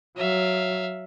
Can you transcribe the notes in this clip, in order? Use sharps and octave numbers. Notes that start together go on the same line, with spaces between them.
F#3 E5 F5